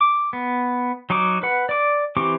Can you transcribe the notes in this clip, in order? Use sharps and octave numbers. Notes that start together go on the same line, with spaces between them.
D6
B3
F#3 D#4 F#4 D6
B4 F#5
D5 D6
E3 C4 G4 C#6 D6